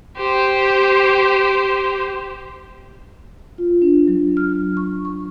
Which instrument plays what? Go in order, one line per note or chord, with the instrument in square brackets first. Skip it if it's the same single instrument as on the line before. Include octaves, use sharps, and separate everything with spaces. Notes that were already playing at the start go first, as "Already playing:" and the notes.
[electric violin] G4 C5
[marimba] F4
D4
F#3
F6
C#6
C#6